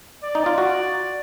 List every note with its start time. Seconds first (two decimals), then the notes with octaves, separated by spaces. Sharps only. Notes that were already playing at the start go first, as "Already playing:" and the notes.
0.24 D5
0.35 D#4
0.46 F4
0.58 F#4